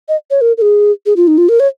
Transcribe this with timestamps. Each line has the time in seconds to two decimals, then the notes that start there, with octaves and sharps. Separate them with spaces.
0.09 D#5
0.31 C#5
0.41 A#4
0.58 A#4
0.62 G#4
1.06 G#4
1.16 F4
1.27 D#4
1.38 F4
1.49 A#4
1.60 C#5